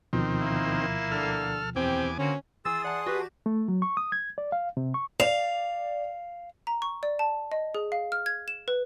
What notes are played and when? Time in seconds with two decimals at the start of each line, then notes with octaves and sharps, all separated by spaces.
0.13 D2 B2 D#3 F3 C4
0.41 A#3 E4
1.12 D3 A4 F6
1.76 E2 C4 G4 G#5 D6
2.18 D3 A#3 C4 C#4 F#4
2.65 E3 G#4 C6 D#6 E6 A6
2.84 D5 F#5 A5
3.07 F#4 G4 B4
3.46 A3
3.68 F#3
3.82 C#6
3.97 D#6
4.12 G#6
4.38 D5
4.52 F5
4.77 C3
4.94 C#6
5.20 D5 F5 F7
6.67 A#5
6.82 C#6
7.03 D5
7.19 A5
7.52 D#5
7.75 G#4
7.92 F5
8.12 F6
8.26 G#6
8.48 E7
8.68 B4